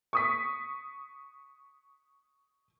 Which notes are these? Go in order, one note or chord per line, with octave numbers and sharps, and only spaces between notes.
C#6 D#6 B6